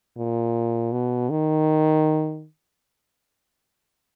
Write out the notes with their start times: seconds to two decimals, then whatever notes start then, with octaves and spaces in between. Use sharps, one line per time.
0.17 A#2
0.92 B2
1.30 D#3